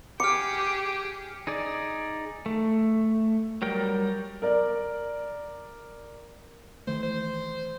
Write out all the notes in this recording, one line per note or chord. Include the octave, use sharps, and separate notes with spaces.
G4 G#4 D6 F6 C#7
D#4 G#4 D5
A3
F#3 G3 A#4 G5
A#4 D5
D#3 E3 A3 C5
C5